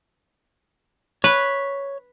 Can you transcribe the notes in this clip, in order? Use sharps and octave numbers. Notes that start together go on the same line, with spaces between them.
B4 C#5